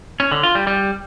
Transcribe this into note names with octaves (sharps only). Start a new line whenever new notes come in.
C#4
D3
F4
G3
G3